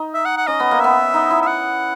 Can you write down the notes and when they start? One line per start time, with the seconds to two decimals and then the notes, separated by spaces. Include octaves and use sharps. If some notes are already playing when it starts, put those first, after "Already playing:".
Already playing: D#4
0.14 E5
0.25 F#5
0.37 F#5
0.47 C#4 D#5
0.60 B3
0.71 A#3
0.80 B3 E5
1.14 D#4
1.31 E4
1.42 E5
1.47 F#5